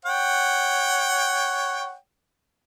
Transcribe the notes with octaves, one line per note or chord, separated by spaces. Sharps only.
C#5 F#5 G5